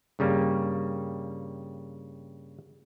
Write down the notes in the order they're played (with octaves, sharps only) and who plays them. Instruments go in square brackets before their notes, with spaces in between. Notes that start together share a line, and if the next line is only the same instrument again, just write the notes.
[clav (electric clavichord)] G2 C#3 G3 A#3